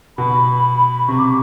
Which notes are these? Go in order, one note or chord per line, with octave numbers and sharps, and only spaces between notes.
B2 B5
C3 C#6
D6